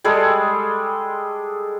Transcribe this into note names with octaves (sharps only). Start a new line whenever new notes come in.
G3 G#3 G#4 A4